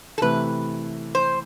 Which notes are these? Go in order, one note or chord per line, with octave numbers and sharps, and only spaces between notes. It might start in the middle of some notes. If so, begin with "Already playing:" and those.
A4
C3 E3 A3 E4 B4
C5